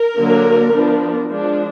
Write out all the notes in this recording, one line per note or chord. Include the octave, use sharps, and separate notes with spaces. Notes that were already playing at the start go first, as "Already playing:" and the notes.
Already playing: A#4
D3 F#3 A#3 D4
F3 B3 D4
F3 G#3 D4